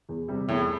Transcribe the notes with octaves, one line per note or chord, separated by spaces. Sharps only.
E2
C3 G3
E2 A2